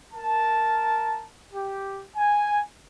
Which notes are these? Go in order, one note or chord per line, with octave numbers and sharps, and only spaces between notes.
A#4 A5
G4
G#5